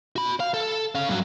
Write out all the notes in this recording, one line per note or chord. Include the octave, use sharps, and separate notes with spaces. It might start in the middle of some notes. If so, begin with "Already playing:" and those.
F#4 B5
F5
A4
C#4 F5
G2 F#3